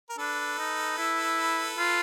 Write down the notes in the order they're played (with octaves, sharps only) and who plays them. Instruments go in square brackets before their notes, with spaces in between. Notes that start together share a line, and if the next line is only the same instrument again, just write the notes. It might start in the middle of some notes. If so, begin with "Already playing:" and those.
[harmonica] A#4
[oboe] D4 [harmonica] A4 B4
[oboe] D#4
E4
F4